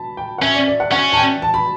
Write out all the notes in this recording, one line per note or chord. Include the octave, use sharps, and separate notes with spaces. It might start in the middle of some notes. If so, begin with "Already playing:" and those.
Already playing: A5 B5
G5
F#5
C#4 E5
D5
D5
F#5
C#4 F#5
A5
G5
A5
B5